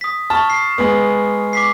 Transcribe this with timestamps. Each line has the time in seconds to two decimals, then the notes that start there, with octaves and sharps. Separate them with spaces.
0.01 D#6 B6
0.30 A5 C#6 F6
0.50 C7
0.78 G#3 B3
1.53 D6 B6 C7